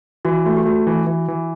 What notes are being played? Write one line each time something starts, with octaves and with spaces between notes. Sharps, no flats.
E3 F#4
A3 F#4
G4
A3 F#4
E3
E3
E3